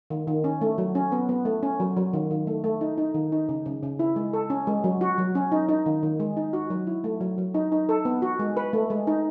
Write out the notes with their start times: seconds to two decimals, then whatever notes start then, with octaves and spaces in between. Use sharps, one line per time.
0.10 D#3
0.27 D#3
0.44 C#4
0.61 A3
0.78 F#3
0.95 C#4
1.12 B3
1.29 B3
1.45 A3
1.63 C#4
1.80 F#3
1.97 F#3
2.13 D#3
2.31 D#3
2.47 A3
2.64 A3
2.81 D#4
2.98 D#4
3.14 D#3
3.32 D#4
3.49 C#3
3.66 C#3
3.83 C#3
3.99 E4
4.16 G#3
4.33 A4
4.50 C#4
4.67 G#3
4.84 F#3
5.01 F#4
5.18 F#3
5.35 C#4
5.52 D#4
5.69 D#4
5.86 D#3
6.03 D#3
6.20 G#3
6.37 D#4
6.53 F#4
6.70 F#3
6.87 E4
7.04 A3
7.21 F#3
7.38 F#3
7.54 D#4
7.72 D#4
7.89 A4
8.05 B3
8.22 F#4
8.39 G#3
8.57 B4
8.73 A3
8.90 G#3
9.07 D#4